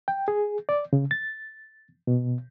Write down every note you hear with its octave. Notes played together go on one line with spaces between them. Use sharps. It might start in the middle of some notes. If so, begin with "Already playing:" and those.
G5
G#4
D5
C#3
A6
B2